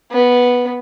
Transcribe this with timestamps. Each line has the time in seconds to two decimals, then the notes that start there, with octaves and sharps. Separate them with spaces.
0.11 B3